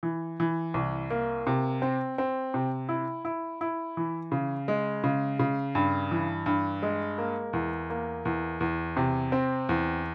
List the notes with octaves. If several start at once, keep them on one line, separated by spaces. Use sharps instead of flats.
E3
E3
C2
A#3
C3
C4
C4
C3
E4
E4
E4
E3
C#3
G#3
C#3
C#3
G2
E3
G2
G#3
A#3
E2
A#3
E2
E2
C3
C4
E2